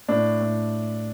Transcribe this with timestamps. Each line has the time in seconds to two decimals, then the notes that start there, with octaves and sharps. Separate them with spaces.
0.09 A2 D4
0.41 A2